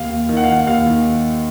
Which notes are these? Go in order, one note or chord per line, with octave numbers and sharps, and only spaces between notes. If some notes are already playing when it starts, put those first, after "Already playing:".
Already playing: D#2 F5
D#2
D#3
F#5
F5
D#3 F#5
D#2 F5
D#3